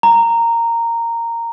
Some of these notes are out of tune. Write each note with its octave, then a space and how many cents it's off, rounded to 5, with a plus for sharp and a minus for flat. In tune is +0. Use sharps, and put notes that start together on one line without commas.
A#5 -10